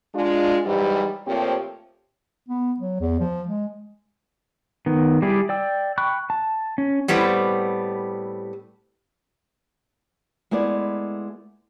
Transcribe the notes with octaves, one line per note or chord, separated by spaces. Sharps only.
G#3 D4 F4
G#2 E3 F#3 G3
A#2 F3 A3 C4 G4 C#5
B3
F#3
E2
F3
G#3
D#3 B3
G3 E4 G4 G#4 D5
D5 G5 E6
G5 B5 C#6 F#6
A5
C#4
A2 G3 B3 C4
G#3 A3 B3 E4 D5